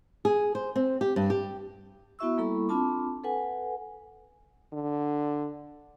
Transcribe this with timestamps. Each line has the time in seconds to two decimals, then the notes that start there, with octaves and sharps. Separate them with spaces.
0.25 G#4
0.55 C5
0.76 C4
1.01 G4
1.16 G2
1.30 G4
2.19 B3 E4 F#4 E5 C#6 E6
2.38 G3 A#3 E4 A4 B5 C#6
2.68 C4 D4 F4 A5 B5 D6
3.24 A4 B4 F#5 G#5
4.73 D3